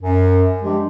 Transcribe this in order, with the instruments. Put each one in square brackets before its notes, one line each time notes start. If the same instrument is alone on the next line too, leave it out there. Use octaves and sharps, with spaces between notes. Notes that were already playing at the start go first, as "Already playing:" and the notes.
[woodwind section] F#2
F3 G#3 D4 G4